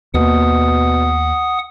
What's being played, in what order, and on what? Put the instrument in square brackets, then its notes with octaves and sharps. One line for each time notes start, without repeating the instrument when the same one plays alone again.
[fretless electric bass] D#2 A#3 [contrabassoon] B2 [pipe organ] F#5 D#6